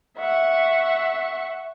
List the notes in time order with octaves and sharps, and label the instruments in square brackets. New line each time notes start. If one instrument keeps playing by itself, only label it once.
[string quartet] E5 F#5 C#6